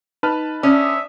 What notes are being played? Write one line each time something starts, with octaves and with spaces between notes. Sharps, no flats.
D#4 B4 A5 F6
C#4 D5 E5 D#6